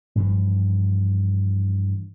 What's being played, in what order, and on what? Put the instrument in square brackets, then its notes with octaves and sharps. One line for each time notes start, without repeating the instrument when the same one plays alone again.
[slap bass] G2 E3 F3